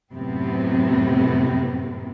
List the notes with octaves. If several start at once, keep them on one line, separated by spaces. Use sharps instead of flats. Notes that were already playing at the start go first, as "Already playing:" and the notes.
F#2 A2 C3 B3 C4